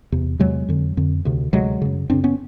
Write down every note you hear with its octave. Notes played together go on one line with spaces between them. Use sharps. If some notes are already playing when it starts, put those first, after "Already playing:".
E2 C3
E2 C3 F#3 G#3
F2 D3
F2 D3
D2 C3
D2 C3 F#3 G#3
F#2 C#3
F#2 C#3 C4 D4
B3 C#4